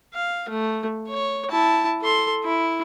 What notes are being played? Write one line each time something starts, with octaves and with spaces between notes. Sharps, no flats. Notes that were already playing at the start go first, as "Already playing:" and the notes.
F5
A3
C#5
E4 A5
A4 C6
E4